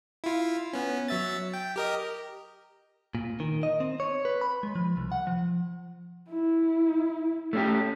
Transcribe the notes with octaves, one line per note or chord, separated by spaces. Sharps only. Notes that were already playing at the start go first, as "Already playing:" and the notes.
E4 F4
B3 C#4
F#3 E5 A6
G5
G4 A#4 D#5
A#2
D#3
D#5
C4
C#5
B4
B5
G#3
F3
C2
F#5
F3
E4
A3 C#4 G4